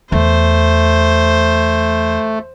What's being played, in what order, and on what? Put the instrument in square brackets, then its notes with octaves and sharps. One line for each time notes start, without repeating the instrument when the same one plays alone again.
[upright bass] E2 [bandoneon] A3 [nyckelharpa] C5